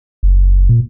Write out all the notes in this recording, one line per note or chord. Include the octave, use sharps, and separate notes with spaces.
F#1
A#2